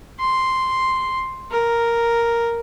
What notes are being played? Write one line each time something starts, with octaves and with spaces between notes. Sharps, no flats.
C6
A#4